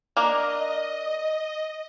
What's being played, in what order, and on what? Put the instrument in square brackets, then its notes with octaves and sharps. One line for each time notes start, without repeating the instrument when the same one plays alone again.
[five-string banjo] A#3 D4 A#4 [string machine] D#5